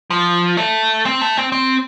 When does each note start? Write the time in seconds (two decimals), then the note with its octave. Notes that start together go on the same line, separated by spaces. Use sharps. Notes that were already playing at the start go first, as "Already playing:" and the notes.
0.10 F3
0.57 A3
1.05 C4
1.21 A3
1.37 C4
1.52 C4